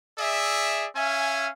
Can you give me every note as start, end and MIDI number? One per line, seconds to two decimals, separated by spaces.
0.19 0.87 68
0.19 0.87 74
0.19 0.87 76
0.96 1.49 61
0.96 1.49 76
0.96 1.49 77
0.96 1.49 80